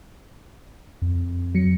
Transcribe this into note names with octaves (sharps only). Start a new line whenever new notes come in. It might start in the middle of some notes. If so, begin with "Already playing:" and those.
F2
F#3 C#7